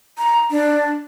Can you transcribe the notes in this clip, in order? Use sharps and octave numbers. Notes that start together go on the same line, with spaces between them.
A#5
D4